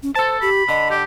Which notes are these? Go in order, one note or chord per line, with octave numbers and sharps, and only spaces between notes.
C#4
A4 C5 A5
G4 B5
D3 D#5
G4